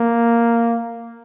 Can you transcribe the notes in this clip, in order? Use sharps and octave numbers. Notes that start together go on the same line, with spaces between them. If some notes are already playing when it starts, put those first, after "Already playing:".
Already playing: A#3